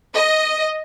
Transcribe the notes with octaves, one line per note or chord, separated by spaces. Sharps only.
D#5